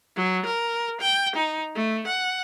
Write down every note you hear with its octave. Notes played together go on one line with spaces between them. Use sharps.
F#3
A#4
G5
D#4
A3
F#5